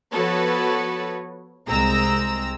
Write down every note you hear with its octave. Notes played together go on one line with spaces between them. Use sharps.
F3 B3 F#4 A4 B4 C#5
C2 G#3 C4 A#5 E6